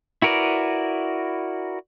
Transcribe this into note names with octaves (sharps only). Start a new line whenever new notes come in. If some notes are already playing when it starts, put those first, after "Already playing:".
E4 F#4 A#4 B4 D5